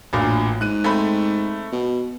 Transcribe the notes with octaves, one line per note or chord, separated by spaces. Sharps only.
A1 D2 A#2 F5
G#2 F#6 D#7
A3 C4 B5
B2